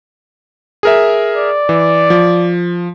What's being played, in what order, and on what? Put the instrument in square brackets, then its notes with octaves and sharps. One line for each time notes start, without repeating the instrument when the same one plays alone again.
[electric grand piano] G#4 A#4 E5
[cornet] D5
[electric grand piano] E3
F3